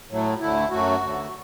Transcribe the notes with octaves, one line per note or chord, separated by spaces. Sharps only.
A2 F#3 A3
D2 D3 A3 E4
F#2 F#3 A3 F#4
D2 D3 A3